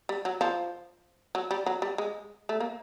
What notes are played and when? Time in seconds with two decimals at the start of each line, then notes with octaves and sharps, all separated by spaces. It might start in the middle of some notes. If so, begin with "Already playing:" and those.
0.09 G3
0.25 F#3
0.41 F3
1.35 F#3
1.51 G3
1.66 F#3
1.82 G3
1.98 G#3
2.49 A3
2.60 A#3